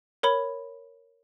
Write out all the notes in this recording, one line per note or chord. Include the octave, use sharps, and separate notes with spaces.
A#4 C#5 B5